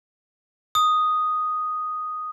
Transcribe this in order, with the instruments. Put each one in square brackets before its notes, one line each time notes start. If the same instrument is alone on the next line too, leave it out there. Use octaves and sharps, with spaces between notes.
[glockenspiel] D#6